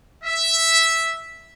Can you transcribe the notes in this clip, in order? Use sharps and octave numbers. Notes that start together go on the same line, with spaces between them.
E5